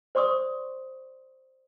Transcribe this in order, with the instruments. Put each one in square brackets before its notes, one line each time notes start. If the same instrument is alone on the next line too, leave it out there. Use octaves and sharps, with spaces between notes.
[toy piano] C5 D5 C6 C#6 D#6